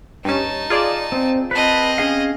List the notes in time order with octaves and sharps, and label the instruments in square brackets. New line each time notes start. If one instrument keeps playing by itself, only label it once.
[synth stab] G2 C#4 [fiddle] D#4 A5
[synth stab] F4 G#4 D5
[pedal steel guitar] C4
[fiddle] C4 D#5 [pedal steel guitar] B4 A5
[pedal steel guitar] C#4 G#4 F5